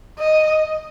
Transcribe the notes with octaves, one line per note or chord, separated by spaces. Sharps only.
D#5